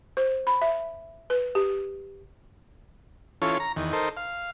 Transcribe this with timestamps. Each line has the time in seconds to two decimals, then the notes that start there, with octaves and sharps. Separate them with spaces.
0.17 C5
0.47 B5
0.61 E5
1.30 B4
1.55 G4
3.42 E3 C#4 F4 A4 C#5
3.60 A#5
3.76 E2 D#3
3.93 D#4 A4 A#4 C5
4.17 F5